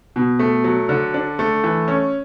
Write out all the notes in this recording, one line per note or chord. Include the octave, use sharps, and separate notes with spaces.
B2
A3
F#3
D3
D4
A3
E3
C#4